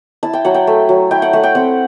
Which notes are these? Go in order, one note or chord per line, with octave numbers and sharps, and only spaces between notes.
E4 A5
G5
F#3 F#5
G5
A3
F#3
E4 G5
F#5
A3 F#5
G5
C4 F#5